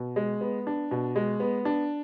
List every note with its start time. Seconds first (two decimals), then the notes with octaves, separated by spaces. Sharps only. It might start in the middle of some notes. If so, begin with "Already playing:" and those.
Already playing: B2
0.16 G#3
0.41 B3
0.67 D4
0.91 B2
1.16 G#3
1.40 B3
1.65 D4